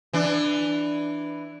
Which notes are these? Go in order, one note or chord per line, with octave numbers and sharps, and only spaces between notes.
E3 D4